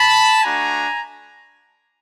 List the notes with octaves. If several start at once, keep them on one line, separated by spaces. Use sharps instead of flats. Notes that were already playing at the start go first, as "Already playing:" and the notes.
Already playing: A5 B5
A3 D4 F#4 G#5 A#5